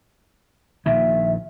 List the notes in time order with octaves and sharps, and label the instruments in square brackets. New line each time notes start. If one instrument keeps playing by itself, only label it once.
[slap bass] A#1 A#2 D#3 [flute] E5